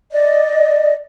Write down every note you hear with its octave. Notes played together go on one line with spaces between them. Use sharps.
D5 D#5